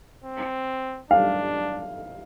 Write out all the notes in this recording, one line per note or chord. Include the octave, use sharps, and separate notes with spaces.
C4
D4 F5